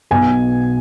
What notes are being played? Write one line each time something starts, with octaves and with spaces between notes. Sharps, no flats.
B1 B2 G#5